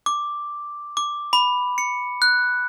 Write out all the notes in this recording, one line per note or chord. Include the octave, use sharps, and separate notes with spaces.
D6
D6
B5
C#7
F#6